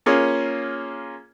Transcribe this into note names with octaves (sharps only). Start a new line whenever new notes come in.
A#3 C#4 F4 G#4